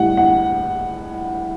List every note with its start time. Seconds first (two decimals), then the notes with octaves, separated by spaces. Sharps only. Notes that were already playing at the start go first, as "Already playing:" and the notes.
Already playing: A2 G3 F#5
0.17 F#5